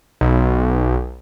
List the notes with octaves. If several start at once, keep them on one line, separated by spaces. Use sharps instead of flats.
B1